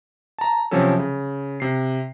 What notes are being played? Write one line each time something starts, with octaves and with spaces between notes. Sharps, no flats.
A5 A#5
C3 F3 F#3 C#4 A4
C#3
C3 C7